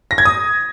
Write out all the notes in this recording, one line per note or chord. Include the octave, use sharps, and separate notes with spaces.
A#6
G#6
D#6